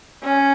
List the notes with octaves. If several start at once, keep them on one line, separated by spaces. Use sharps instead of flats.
C#4